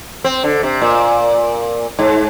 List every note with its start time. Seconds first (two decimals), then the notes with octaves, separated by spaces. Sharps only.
0.24 C4
0.44 D3
0.63 C3
0.82 A#2
1.99 G#2